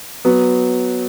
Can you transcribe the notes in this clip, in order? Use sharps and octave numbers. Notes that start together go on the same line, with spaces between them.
F#3 B3